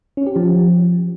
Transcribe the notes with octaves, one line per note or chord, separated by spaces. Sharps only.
C#4
G4
F3